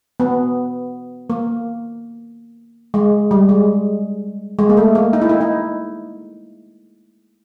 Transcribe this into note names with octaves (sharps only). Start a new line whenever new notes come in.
B3
A#3
G#3
G3
G#3
G#3
A#3
A3
A#3
D#4
E4
D#4
D#4